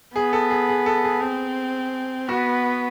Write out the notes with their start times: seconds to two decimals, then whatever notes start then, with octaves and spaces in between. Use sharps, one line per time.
0.16 B3 G#4
0.33 A4
0.50 G#4
0.69 G#4
0.86 A4
1.04 G#4
1.21 C4
2.28 B3 F#4